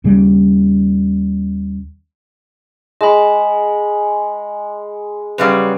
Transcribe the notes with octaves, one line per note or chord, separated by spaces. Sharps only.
D#2 C#3 G3
G#3 D#5 B5
F#2 C#3 G3 B4